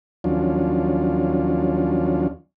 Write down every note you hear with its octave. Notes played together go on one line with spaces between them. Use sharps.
D#2 F3 F#3 C#4 D4 F4